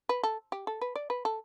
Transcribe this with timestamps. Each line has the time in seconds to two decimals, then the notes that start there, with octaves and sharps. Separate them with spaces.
0.09 B4
0.23 A4
0.52 G4
0.67 A4
0.81 B4
0.95 D5
1.10 B4
1.25 A4